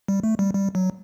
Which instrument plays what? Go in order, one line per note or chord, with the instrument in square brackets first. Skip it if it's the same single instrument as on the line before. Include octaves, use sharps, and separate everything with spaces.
[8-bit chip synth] G3
A3
G3
G3
F#3